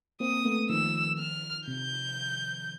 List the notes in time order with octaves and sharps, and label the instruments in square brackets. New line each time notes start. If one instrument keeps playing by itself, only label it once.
[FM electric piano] A#3 C4 [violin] D#6
[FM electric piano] A3 B3
[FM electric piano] D#3 F3 [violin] E6
[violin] F6
[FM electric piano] C3 [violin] G6